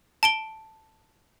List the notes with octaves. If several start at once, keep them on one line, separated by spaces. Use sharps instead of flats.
A5 D7 G7